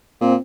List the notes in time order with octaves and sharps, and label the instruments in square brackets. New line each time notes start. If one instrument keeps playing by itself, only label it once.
[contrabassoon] A#2 [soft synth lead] C4